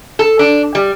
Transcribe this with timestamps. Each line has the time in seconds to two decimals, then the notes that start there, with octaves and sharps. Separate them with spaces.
0.19 A4
0.39 D4
0.75 G3